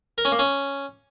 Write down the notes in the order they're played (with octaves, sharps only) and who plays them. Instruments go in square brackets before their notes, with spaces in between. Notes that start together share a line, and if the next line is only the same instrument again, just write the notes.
[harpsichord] A#4
C#4
A#3
C#4